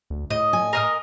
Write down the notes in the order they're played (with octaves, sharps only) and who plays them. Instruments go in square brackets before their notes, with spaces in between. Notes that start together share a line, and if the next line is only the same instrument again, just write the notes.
[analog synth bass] D2
[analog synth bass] A2 [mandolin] D#5
[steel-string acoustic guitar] G#5
[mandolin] A#4 D#5 F6